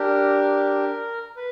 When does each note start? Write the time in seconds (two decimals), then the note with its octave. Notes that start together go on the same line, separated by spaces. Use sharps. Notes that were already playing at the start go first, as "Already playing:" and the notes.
Already playing: D4 G4 A#4
1.36 B4